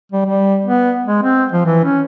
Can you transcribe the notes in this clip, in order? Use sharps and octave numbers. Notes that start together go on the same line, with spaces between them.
G3
G3
B3
G#3
C4
F3
E3
C#4